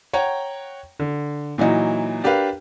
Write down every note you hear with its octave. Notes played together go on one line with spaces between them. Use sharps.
C#5 F#5 G5 A#5
D3
A#2 E3 F#3 D#4 F#4
D4 G4 A#4 B4 F5